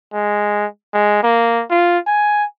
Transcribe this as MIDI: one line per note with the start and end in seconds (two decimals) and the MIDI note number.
0.13 0.66 56
0.93 1.21 56
1.23 1.64 58
1.71 1.98 65
2.07 2.45 80